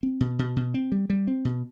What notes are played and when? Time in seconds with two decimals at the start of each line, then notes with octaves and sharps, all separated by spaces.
0.03 C4
0.20 B2
0.39 B2
0.56 B2
0.74 C4
0.92 G3
1.10 G3
1.27 C4
1.45 B2